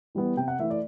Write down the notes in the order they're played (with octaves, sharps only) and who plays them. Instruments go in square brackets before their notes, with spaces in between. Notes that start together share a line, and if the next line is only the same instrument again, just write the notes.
[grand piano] E3 G3 B3
C3 G5
F#5
E3 A3 E5
D5